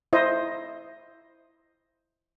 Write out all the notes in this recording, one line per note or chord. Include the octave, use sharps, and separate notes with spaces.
E4 C5 D#5